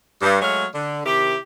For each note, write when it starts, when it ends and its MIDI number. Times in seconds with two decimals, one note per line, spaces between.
0.22 0.37 43
0.41 0.66 54
0.41 0.66 56
0.41 0.66 57
0.41 0.66 73
0.41 0.66 77
0.74 1.01 50
1.05 1.36 48
1.05 1.36 51
1.05 1.36 64
1.05 1.36 67